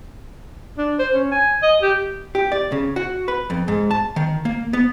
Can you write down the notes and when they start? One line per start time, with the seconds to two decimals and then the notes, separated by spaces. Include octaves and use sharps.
0.78 D4
0.99 C5
1.13 C#4
1.32 G#5
1.62 D#5
1.82 G4
2.35 G4
2.52 D5
2.72 C#3
2.96 F#4
3.28 B4
3.50 F2
3.68 G#2
3.91 A5
4.16 D#3
4.45 A#3
4.73 B3